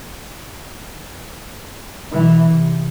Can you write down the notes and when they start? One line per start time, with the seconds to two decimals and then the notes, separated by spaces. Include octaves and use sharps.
2.12 B2 E3
2.50 C3